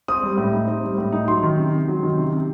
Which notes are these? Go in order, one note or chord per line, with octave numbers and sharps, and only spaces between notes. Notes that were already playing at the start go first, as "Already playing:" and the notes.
C4 D#6
G3
A2
D#4
C4
G3
A2
D#4
F#3 C6
D#3
C3
C3
F#3
D#3
C3
C3